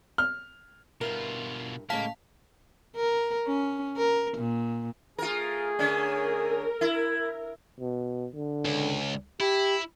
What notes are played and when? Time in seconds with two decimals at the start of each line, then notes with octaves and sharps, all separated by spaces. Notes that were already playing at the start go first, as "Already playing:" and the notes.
0.18 F6
1.01 G2 B2 E4 F4 A#4
1.90 A2 C#3 G#3 A#3 F5 A5 B6
2.96 A#4
3.47 C#4
3.97 A#4
4.38 A#2
5.18 A3 F4 G#4 A#4
5.79 D3 C#4 A#4
6.81 E4
7.80 B2
8.34 D3
8.65 C#2
9.40 E4 G4